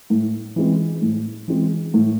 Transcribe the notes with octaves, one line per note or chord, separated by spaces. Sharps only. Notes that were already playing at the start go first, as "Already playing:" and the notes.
A2
E3 G#3 C4
A2
E3 G#3 C4
A2